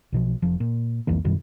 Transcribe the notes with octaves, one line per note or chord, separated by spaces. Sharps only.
B1 B2 F3
F1 F3
A#2
C2 F2 E3 A#3
F#2 B2 D#3 G3